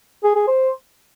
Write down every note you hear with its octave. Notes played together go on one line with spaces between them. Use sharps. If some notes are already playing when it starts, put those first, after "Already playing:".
G#4
G#4
C5